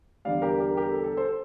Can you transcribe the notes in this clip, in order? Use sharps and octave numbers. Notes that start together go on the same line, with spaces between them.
E2 D3 G3 D5 F5
G4 A#4
G4 A#4
G4 A#4
A4
A4
A4 C5